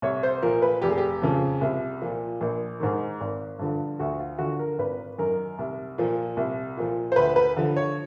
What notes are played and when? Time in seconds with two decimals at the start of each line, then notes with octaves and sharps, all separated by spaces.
0.02 C2 C#5
0.23 C5
0.42 A#2 F3 A#4
0.62 B4
0.82 F1 G4
0.90 G#4
0.98 G4
1.22 F2 C#3 F3
1.61 C2
2.02 A#2 F3
2.41 A#1
2.80 G#2 D#3
3.21 G#1
3.59 G2 D3 F3
3.99 D2 F#4
4.20 F4
4.39 D3 F3 F#4
4.59 A#4
4.78 G#1 B4
5.18 F#2 D#3 A#4
5.59 C2
5.98 A#2 F3
6.37 C2
6.77 A#2 F3
7.12 C5
7.16 D2 B4
7.36 B4
7.57 D3 F3
7.76 C#5